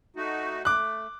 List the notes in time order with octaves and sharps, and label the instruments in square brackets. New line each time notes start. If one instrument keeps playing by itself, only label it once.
[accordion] A3 D#4 F#4
[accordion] A3 [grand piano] D6 F#6